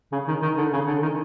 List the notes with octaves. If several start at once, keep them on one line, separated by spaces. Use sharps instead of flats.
C#3
D#3
D#3
D3
C#3
D3
D#3